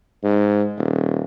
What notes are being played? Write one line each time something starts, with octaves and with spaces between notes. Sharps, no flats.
G#2
D#1